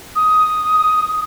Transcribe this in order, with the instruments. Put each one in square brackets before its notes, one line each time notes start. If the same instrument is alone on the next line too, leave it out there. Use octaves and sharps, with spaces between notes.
[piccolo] D#6